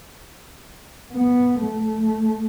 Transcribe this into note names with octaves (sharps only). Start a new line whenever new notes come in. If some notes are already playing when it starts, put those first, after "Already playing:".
B3
A3